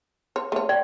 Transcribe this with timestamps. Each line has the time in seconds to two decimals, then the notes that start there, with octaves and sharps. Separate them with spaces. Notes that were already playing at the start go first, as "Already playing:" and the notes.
0.36 C#5
0.52 A3 C#5
0.69 D5 G5